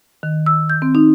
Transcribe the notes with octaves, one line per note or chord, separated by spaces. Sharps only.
D#3
E6
G6
C4
D#4